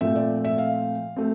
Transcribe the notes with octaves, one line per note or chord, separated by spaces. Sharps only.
A#2 F3 A3 C4 E5
D5
E5
F5
A3 C4